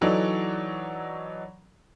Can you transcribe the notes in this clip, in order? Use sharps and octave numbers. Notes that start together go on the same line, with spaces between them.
E3 F#3 D#4 A4 D5